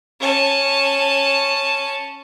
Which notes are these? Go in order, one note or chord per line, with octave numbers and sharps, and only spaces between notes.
C#4 A5